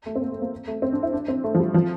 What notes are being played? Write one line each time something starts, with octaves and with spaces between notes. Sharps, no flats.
A3
C4
A#3
A3
A#3
A3
C4
D4
E4
D4
C4
A3
F3
G3
F3